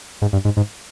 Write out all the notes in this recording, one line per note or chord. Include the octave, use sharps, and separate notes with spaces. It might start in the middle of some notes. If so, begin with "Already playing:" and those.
G#2
G2
G#2
G#2